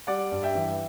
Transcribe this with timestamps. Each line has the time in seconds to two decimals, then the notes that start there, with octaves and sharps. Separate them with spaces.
0.07 G3 D5 F#5
0.32 G2
0.43 E5 G5
0.55 E3